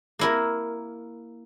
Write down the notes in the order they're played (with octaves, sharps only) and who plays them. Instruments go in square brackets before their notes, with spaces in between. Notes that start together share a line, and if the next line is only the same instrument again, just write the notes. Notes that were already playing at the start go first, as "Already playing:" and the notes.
[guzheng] A#3 E4 A#4